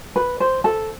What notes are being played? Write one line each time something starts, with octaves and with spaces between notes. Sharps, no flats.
B4
C5
A4